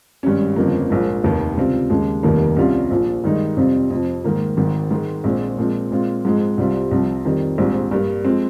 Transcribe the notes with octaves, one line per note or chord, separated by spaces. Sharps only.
G#1 G2 G3 C#4
G1 F2 C#3 F3 A#3
A#1 G#2 F3 A#3
F1 D#2 D#3
C#2 C3 G3 C4 F4
D#2 C#3 G#3
F1 D#2 D#3 G3 A#3
C2 C3 G3 C#4 F4
A#1 A#2 F3
G2 D#3 G#3 D#4
F2 C3 G3 C4 F4
F2 C3 F3
G#2 D#3 A#3
G#1 G#2 D#3
G#2 D#3 G#3
A#1 A#2 G#3 C4
A#2 F3 G#3 C4
A#2 G#3 C4 F4
G#2 F3 G#3 C4
C2 C3 G3 C4 F4
C2 C3 F3 C4
F2 D#3 G3
A#1 G#2 G3 C4
G2 G3 A#3
F3 G#3 C4